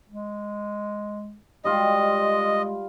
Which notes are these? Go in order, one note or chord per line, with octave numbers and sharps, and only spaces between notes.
G#3
G3 G#3 F4 D#5